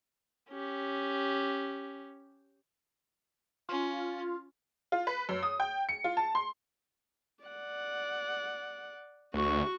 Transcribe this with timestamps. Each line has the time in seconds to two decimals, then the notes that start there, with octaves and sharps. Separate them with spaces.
0.50 C#4 G4
3.69 C#4 F4
4.92 F4
5.07 B4
5.29 F#2
5.43 D#6
5.60 G5
5.89 C#7
6.04 F4
6.17 A5
6.35 C6
7.44 D5 F#5
9.34 D2 F#4 C#6